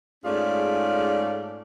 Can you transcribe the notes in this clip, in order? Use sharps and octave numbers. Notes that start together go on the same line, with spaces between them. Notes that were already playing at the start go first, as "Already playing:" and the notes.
G#2 A3 C#4 F4 G#4 D5